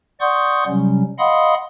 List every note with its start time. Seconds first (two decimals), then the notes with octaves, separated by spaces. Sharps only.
0.21 D5 F#5 C6 C#6 D#6 G6
0.67 C3 F#3 G3 C#4
1.19 D#5 F5 F#5 B5 C6 D#6